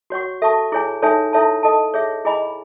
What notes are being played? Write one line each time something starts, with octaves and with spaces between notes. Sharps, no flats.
F#4 C#5 F#5 C#6
A4 E5 A5 C#6
E4 G#4 C#5 G#5
D#4 A4 C#5 E5 G#5
E4 A4 C#5 E5 A5
A4 D#5 A5
G#4 C#5 E5
E4 G#4 D#5 G#5 B5